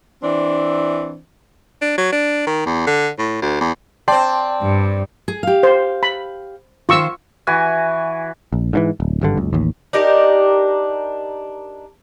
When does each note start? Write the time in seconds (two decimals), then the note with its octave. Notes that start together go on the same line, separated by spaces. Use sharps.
0.23 E3 C4 D4
1.82 D4
1.98 F#3
2.12 D4
2.47 D#3
2.66 E2
2.87 D3
3.19 A2
3.42 D2
3.61 E2
4.08 C4 D5 G5 A5 C6
4.62 G2
5.28 G#4
5.43 G4 F5
5.63 C5
6.03 B5
6.89 D#3 F4 C5 C#6 E6
7.47 E3 F#4 G#5
8.53 A#1
8.73 G#2 C#3 E3
9.00 D1
9.21 G#1 G2 D3
9.37 F#1 C#2
9.53 A1 D#2
9.93 D4 D#4 G4 A#4